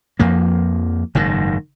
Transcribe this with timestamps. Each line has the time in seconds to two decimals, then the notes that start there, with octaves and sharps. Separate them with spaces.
0.19 F2 F3 A#3
1.15 F#1 G#2 D#3